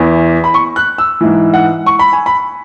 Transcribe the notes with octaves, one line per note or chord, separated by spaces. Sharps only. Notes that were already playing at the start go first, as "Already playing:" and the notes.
Already playing: E2 E3
B5
C#6
F#6
E6
G#2 E3
F#5
C#6
B5
G#5
B5